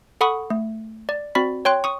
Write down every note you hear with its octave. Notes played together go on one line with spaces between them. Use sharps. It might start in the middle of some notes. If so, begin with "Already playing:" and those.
A4 F#5 B5 C#6 D#6
A3
D5
C4 F#4 D5 B5 B6
C#5 G5 C6 F#6
C#6 D#6